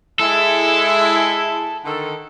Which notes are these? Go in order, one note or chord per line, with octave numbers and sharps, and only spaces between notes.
G#3 E4 A4
D3 D#3 A4